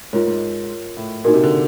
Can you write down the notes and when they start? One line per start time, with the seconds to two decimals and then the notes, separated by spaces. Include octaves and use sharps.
0.13 G#2 F4 A#4 C#5
0.27 G#2
0.97 A2
1.24 A#2 D#4 F#4 A#4
1.34 C3
1.44 D3